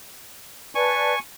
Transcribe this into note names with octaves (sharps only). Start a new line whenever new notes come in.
B4 D5 G#5 A5 C#6